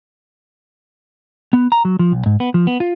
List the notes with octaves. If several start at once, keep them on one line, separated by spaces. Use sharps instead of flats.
B3
A#5
F#3
F3
B1
G#2
B3
F3
B3
F4